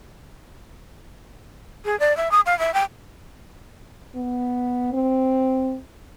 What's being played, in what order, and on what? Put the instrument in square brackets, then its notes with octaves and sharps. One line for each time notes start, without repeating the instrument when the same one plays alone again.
[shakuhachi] G#4
D5
E5
D#6
F5
E5
G5
[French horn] B3
C4